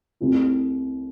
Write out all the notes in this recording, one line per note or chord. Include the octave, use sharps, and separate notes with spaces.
C2 C3 A3 C4 E4